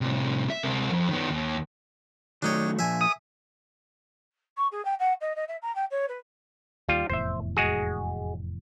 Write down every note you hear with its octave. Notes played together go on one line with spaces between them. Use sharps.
A2 C3
E5
C3 A#4
F2
D#3 B3
D#2
D#3 F#3 A3 D4 D#4 C#5
A#2 F3 E5 G#5
D#6
C#6
G#4
G5
F#5
D#5
D#5
E5
A#5
G5
C#5
B4
D#2 G3 F4
F1 E2 A2 C5 E5
G#3 F#4 G#4